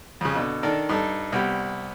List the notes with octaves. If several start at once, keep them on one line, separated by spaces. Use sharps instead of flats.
F2 C#3
B2 D3
D#3 D4 A4 A#4
G2 D#4 A4
C2 B3 G4